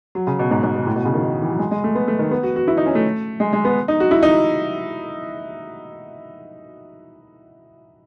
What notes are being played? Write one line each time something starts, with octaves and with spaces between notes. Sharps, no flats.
F#3
C#3
B2
G#2
G#2
B2
A2
B2
C#3
D#3
D#3
E3
F#3
G#3
G#3
A3
B3
A3
D#3
B3
F#4
F#4
E4
D#4
C#4
A3
G#3
G#3
B3
D#4
F#4
E4
D#4